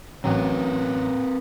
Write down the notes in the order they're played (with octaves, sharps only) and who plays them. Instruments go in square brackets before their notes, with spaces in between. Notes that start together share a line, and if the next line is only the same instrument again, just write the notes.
[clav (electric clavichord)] A1 F#3 [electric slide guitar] C4 A#4 B4